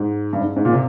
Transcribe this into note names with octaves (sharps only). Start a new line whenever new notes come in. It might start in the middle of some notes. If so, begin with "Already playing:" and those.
Already playing: G#2
G2
G#2
G#2
A#2
C3